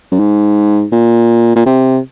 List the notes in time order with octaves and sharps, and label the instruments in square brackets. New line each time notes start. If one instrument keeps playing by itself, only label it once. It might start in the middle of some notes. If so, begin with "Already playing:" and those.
[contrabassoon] F#2
G#2
A#2
A#2
C3